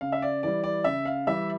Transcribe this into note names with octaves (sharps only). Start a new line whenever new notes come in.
C#3 F5
E5
D5
E3 G3 D5
D5
C#3 E5
F5
E3 G3 E5